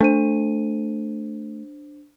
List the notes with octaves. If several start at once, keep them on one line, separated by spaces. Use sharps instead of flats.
A3 D4 C5 D#7